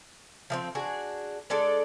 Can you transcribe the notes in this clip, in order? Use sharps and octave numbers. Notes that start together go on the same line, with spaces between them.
F3 G#3 C4
D4 F#4 G#4
G#3 D4 A4 D5